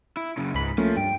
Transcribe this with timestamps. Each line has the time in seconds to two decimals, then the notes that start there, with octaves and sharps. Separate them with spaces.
0.17 E4
0.37 F#2 C#3
0.54 C#2 G#2 B5
0.78 F3 A3 A#3 C#4
0.97 G2 G5